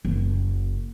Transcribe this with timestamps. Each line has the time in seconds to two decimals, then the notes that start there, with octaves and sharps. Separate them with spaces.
0.05 F#1